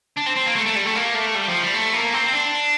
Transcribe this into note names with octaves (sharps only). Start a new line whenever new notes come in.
D4
C4
C4
A#3
A3
A3
G3
A3
A#3
A3
G3
F3
G3
A3
A#3
C4
D4